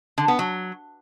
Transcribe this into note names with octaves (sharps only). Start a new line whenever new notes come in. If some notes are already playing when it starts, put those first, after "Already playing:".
D3
B3
F#3